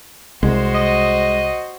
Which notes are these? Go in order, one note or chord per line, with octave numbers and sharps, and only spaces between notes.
C2 G#3 F#4 C5
D#5